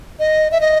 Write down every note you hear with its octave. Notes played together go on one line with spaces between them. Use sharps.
D#5
E5
D#5